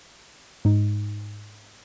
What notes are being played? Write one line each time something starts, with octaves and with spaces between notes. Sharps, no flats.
G#2 D#4